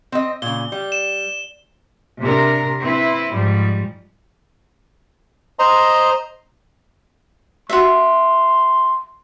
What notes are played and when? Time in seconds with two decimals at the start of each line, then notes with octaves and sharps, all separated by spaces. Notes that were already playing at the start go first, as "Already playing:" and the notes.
0.12 C4 D#5
0.42 A#2 C#3 G7
0.72 G3
0.92 E7
2.21 C3 D4 A#4
2.80 C4 E4 B4
3.32 G#2 F3 G3
5.59 C5 D#5 A#5 C6
7.70 F#4 E5 C6